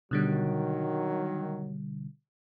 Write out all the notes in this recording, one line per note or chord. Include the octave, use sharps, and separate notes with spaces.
B2 D3 D#3 F#3 G3